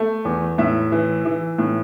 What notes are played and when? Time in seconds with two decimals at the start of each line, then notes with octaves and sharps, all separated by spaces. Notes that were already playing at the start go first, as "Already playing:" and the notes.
Already playing: A3
0.25 E2
0.58 A2 E5
0.92 E3
1.25 E3
1.58 A2